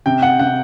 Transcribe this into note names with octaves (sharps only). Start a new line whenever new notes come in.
C3 G5
F#5
C3 F#5